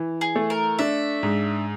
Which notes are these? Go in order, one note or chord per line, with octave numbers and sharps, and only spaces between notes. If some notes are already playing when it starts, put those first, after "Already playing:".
Already playing: E3
G#4
A3
A#4
D4 E5
G#2